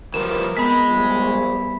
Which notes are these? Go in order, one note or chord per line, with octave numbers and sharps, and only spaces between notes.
E3 F3 G3 F#4 A#4 E7
G#3 B3 C4 G5 B5 B6
A#1 E3 G3
E4